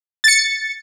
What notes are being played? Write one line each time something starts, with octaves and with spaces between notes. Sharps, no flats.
A6 C#7